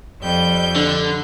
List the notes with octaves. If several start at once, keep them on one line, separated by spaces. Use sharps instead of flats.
F2 G3 G6
D3